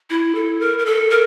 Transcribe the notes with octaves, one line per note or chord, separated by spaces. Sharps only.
E4
A4
A#4
A#4
A4
A#4